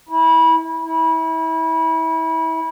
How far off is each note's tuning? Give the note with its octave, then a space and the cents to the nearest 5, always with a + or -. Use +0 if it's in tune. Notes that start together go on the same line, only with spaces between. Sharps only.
E4 -25
E4 -30